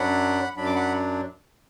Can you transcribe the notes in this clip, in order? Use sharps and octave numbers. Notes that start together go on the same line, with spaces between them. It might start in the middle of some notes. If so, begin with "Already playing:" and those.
Already playing: F#2 F#3 D4 F#5 B5
F#2 F#3 D4 B5
D6
F#5 B5